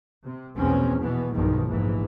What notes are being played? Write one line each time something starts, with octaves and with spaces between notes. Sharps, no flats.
C3
A#1 E2 B2 C4 C#4
B2 E3 B3
B1 E2 G2 D#3 F3
F1 A#1 G#2 E3